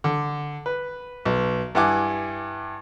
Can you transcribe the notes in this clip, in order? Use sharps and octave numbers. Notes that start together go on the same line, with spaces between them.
D3
B4
B1
G2 E4 F#5 G#5 D6